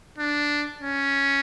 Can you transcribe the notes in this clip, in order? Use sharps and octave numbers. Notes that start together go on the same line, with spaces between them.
D4
C#4